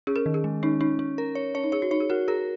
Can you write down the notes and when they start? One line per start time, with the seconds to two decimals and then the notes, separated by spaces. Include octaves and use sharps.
0.07 C#4 G#4
0.16 A#4
0.26 D#3
0.34 G#4
0.44 G#3
0.63 C#4 D#4
0.81 C#4 D#4
0.99 C#4
1.18 A#4
1.35 C#5
1.55 C#4 C#5
1.64 D#4
1.72 G#4 C#5
1.82 F#4
1.91 D#4 C#5
2.00 G#4
2.10 F#4 A#4
2.28 G#4 A#4